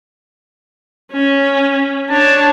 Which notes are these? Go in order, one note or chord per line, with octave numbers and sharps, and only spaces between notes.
C#4
D4 C#5 A5